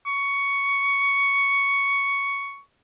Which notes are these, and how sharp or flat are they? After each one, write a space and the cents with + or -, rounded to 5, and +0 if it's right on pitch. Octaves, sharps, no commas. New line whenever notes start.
C#6 +10